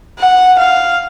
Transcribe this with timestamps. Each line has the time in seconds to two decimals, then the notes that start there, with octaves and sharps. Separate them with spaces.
0.19 F#5
0.59 F5